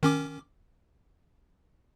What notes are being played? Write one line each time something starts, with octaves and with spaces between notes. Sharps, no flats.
D#3 C#4 D6